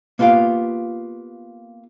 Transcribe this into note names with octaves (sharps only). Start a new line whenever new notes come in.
A#3 B3 F4 G4 F5